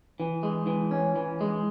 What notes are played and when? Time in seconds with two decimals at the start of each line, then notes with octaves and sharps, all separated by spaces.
0.20 E3
0.43 G#3
0.67 E3
0.91 C#4
1.16 E3
1.41 G#3